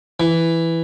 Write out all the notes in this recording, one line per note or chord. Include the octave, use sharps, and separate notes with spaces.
E3